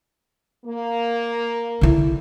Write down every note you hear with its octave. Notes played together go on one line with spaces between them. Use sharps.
A#3
D3 E4